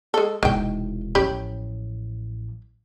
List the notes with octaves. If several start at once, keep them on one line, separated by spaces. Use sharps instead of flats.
G#3 A4
E1 C3 D#3 G5
A1 F3 C#4 G4 B5